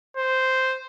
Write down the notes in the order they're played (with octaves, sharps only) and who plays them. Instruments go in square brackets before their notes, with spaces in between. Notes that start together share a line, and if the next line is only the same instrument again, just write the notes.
[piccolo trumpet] C5